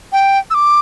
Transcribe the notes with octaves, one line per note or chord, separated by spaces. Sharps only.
G5
E6
D6